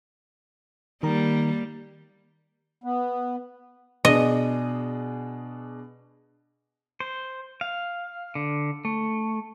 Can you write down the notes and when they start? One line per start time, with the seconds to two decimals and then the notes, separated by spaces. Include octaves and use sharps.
1.03 D#3 G3 A#3 A#5
2.84 B3
4.05 B2 D4 G#4 D#5
7.00 C5
7.61 F5
8.35 D3
8.85 A3